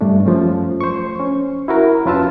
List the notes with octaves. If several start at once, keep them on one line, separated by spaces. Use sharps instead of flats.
G2 A3 D4
F#2 F3 A3 C#4
C5 C#6
C#4
E4 F#4 A#4
F2 C#4 F4 B4 A5 E6